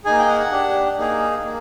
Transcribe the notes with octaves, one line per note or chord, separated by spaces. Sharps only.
A#3 D#4 G#4 G#5
G5
F#5
D4 G4
A#3 D#4 G#4
A#3